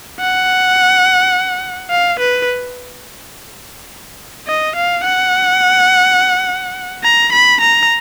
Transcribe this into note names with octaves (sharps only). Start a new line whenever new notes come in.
F#5
F5
B4
D#5
F5
F#5
A#5
B5
A#5